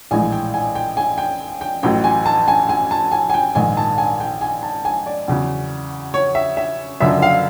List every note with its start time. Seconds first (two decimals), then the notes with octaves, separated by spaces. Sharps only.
0.11 A#1 A2 E3 G#3 G#5
0.32 G5
0.54 G#5
0.75 G5
0.97 G#5
1.18 G5
1.61 G5
1.83 A1 A2 F#3 G5
2.04 G#5
2.26 A5
2.48 G#5
2.69 G#5
2.91 A5
3.12 G#5
3.30 G#5
3.34 G5
3.55 A#1 G#2 D#3 G#5
3.77 A5
3.98 G#5
4.20 G5
4.41 G#5
4.63 A5
4.85 G#5
5.06 D5
5.28 E2 C#3 F#3
6.14 C#5
6.35 E5
6.57 E5
7.00 F#1 F#2 D3 F3 E5
7.22 F5